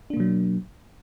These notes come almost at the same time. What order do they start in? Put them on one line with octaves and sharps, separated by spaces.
D4 A#3 B2 F#3